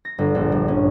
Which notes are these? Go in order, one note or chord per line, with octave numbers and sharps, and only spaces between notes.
A#6
G1
A#1
G2
C#4